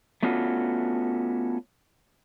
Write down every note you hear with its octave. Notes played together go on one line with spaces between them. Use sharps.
A3 B3 C#4 D4 F4 F#4